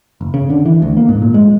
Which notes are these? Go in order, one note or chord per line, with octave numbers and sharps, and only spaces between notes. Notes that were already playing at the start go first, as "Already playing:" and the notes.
F#1
C#3
D3
E3
D2
A#3
G#2
A#2
G#3